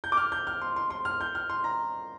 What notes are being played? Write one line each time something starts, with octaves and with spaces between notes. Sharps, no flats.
G6
D6
F6
G6
F6
C6
C6
C6
F6
G6
F6
C6
A#5